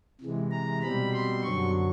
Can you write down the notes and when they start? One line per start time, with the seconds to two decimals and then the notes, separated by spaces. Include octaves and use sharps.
0.21 C3 E3 G#3
0.51 A#5
0.82 B2 G3 C4 B5
1.13 C6
1.43 F#2 D3 F#3 C#6